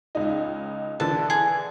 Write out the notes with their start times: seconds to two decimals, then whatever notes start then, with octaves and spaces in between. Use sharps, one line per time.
0.15 C#2 D#4
1.00 D3 E3 A5
1.30 G#4